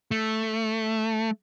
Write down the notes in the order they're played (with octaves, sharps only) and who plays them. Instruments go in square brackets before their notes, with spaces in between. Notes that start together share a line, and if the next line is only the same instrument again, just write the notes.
[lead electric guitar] A3